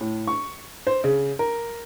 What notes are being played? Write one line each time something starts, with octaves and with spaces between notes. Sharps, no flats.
A2
C#6
C5
C#3
A#4